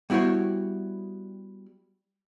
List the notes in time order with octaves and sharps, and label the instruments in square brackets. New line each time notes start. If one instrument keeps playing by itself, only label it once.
[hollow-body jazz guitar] G3 B3 E4 F#4 C5 C#5